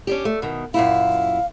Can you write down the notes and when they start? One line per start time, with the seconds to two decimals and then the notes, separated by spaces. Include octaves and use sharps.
0.07 C#4 D4 G4
0.25 A3
0.42 B2 D#3
0.74 F#2 A#2 E4 F5